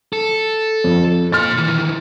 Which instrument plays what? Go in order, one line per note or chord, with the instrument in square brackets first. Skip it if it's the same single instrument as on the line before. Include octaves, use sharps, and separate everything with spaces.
[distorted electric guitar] A4
[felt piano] F2
[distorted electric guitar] A#2 C6 [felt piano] F6 A6
[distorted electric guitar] D#3 E3